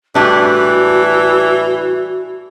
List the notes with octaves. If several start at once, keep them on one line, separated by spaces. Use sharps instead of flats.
A2 E3 G3 D4 F#4